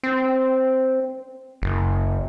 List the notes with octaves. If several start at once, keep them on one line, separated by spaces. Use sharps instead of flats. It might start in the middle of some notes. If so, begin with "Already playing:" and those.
C4
F#1